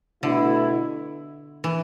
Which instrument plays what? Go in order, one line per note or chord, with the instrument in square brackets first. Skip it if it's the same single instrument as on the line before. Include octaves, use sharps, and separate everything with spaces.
[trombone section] B2 A3 E4 [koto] D3
[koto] E3